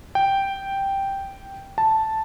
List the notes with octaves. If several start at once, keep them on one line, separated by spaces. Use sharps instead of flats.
G5
A5